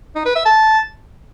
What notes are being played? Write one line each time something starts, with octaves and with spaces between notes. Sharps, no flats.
D#4
B4
E5
A5